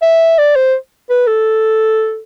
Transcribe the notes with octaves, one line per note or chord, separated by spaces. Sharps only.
E5
D5
C5
B4
A4